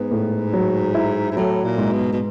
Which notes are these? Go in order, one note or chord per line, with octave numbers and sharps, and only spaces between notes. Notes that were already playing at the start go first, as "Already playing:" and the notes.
Already playing: G#2 B3
A2
F#3
E4
G#2
A2 F#3
A#2
G#2
B2
B2